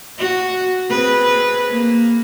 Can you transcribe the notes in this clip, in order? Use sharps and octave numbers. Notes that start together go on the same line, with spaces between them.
F#4
C4 G#4 B4
A#3